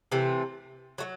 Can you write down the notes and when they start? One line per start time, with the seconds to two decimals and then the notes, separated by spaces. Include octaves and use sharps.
0.12 C3 E3 A3
0.98 F#3 A3